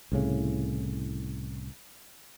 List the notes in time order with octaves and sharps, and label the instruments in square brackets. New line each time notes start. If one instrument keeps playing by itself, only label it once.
[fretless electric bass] C2 A2 C#3